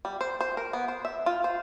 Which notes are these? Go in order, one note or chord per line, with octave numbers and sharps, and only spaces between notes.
G3
C5
C5
A#4
B3
C5
E5
F4
C5